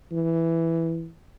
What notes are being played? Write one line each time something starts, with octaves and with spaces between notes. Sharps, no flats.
E3